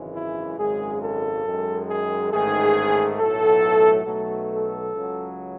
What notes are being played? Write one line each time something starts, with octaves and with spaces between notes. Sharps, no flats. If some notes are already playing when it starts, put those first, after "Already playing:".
Already playing: G#1 F#2 C#3 E3 G#3
E4
G#1 F#2 C#3 G#3 G#4
A4
F#2 D#3 G#3
G#4
A1 G#2 D#3 A3 G#4
B1 A2 F#3 A3 A4
B1 B2 F#3 A3
A4
C#2 C#3 F#3